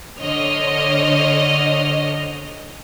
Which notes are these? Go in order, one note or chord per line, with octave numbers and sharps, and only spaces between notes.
D3 C5 C#5 D#5 F6